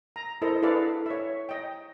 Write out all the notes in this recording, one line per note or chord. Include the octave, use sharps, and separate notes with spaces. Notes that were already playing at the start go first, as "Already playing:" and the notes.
A#5
E4 A4 A#4 C5 D#5
E4 G#4 A4 B4 D5 F5
C#5 E5
D#5 G5